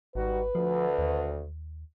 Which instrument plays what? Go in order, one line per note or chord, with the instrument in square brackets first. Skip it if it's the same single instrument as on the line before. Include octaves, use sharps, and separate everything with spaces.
[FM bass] G#1 [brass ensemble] G3 D#4 F#4 [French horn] B4
[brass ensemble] D2 [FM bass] F3
[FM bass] D#2